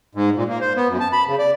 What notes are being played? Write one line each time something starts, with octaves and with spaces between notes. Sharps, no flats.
G#2
A#2
A#3
C5
B3
F#2
A5
B5
C#3
D5